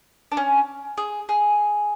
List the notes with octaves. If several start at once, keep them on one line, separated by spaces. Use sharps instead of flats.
D4
C#4
G#4
G#4